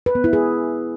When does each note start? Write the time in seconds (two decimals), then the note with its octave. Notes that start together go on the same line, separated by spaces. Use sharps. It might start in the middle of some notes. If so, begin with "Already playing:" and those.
0.06 B4
0.15 B3
0.24 E4
0.33 G#4